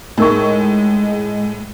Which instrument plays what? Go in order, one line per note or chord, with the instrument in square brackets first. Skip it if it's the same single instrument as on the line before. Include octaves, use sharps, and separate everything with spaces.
[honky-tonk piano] A2 [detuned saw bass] G#3 [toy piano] D#4 A#4 C#6